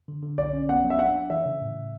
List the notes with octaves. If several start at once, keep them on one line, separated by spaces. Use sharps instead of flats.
D3
D3
B1 D5
C#4
B3 F#5
F#3
E5
D4 F#5
D4
E3 E5
C#3
A2